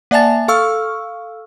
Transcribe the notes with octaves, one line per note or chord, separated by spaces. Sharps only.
A#3 D5 E5 G#5 A5 A6
A4 F5 C#6 E6 F6